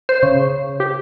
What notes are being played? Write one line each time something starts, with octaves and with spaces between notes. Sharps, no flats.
C5
C#3
G4